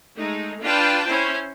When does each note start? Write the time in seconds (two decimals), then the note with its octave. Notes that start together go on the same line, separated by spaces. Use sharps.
0.17 G#3 A3 D#4
0.63 D4 F4 B4 G5 A5
1.08 C#4 E4 C5